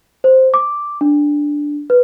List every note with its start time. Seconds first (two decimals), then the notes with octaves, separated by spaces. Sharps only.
0.24 C5
0.54 D6
1.01 D4
1.90 B4